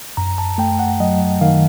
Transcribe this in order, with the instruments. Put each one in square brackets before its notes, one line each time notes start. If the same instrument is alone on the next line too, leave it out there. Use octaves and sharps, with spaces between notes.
[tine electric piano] F#2 A#5
A5
A3 G5
F#5
F#3 D#5
D#3 F5